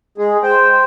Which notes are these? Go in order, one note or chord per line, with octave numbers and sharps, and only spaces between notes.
G#3 G#4
C5 G5